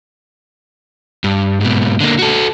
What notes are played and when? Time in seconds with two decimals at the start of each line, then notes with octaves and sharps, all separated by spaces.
1.24 G2
1.61 G#2 B2
2.01 D3 A#3
2.19 F#4 A4